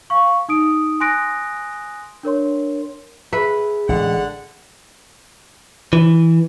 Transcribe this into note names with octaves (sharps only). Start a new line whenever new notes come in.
F5 C#6
D#4 D#6 D7
G#5 C6 D#6 F#6 A#6 D7
D4 A#4 C#5 C6
G#4 B4 E5
A1 A2 D3 G#3 F#5
E3